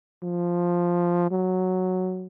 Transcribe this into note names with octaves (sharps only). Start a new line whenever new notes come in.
F3
F#3